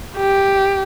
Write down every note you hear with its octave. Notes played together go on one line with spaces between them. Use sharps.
G4